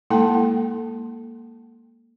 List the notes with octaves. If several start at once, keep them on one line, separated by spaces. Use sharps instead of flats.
G#3 A#3 E4 A4 G5 A5